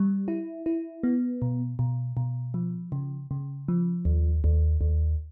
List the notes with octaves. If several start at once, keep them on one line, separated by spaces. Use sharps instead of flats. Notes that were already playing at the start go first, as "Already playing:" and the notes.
Already playing: G3
E4
E4
B3
B2
B2
B2
F3
C#3
C#3
F3
D#2
D#2
D#2